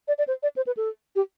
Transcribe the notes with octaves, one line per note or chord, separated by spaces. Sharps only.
D5
D5
C5
D5
C5
B4
A4
G4